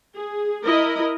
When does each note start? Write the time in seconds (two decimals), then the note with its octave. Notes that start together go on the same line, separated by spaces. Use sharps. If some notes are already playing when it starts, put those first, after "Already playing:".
0.15 G#4
0.66 E4 A#4 D#5